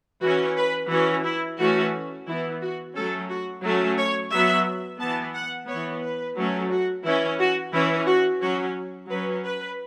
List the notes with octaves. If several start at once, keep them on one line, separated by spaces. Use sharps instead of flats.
E3 C#4 F#4
B4
E3 C#4 F#4
E4
E3 A3 C#4 F#4
E3 B3 E4
F#4
F#3 A3 C#4 A4
F#4
F#3 A3 C#4
C#5
F#3 B3 E5
E3 B3 A5
F#5
E3 B3 C#5
B4
F#3 A3 C#4
F#4
E3 C#4 E4
F#4
E3 C#4 E4
F#4
F#3 C#4 F#4
F#3 C#4 B4
B4